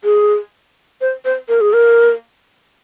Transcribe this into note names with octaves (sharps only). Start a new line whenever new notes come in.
G#4
C5
C5
A#4
G#4
A#4